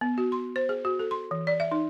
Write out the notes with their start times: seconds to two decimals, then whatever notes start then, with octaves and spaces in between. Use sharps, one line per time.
0.01 B3
0.18 F#4
0.32 C6
0.56 C5
0.69 G#4
0.85 F#4
0.99 A4
1.11 C6
1.31 E3
1.47 D5
1.60 E5
1.72 D#4